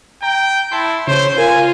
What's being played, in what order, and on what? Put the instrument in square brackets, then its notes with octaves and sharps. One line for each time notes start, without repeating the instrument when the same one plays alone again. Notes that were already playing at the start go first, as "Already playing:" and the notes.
[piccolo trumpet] G5 [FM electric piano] A#5
[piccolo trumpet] E4 [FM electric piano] A5 C6
[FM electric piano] C#3 [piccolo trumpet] C5 [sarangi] C#5
[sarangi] F4 [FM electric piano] A#4 [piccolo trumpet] G#5